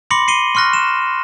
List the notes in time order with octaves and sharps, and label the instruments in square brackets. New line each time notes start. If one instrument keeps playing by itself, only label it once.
[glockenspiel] B5 C6 D6 A#6 C#7 F#7
C7 C#7 D#7 G7
C6 C#6 F6 F#6 A#6
E7